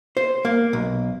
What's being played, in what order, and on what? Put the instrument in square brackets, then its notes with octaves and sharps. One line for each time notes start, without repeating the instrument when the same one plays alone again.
[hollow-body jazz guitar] C5
A#3
B1